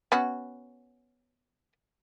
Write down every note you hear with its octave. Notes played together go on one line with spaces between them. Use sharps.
B3 C#4 F#4